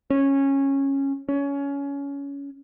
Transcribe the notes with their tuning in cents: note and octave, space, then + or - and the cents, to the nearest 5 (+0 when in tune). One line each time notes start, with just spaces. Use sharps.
C#4 -15
C#4 +20